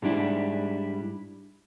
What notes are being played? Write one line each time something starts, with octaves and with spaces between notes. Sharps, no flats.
G#2 G3 D4 E4